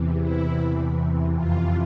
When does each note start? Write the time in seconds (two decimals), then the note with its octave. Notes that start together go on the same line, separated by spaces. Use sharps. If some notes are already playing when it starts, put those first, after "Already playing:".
Already playing: E2 C3 E3
0.21 E4
1.34 F2 C3 E3 F4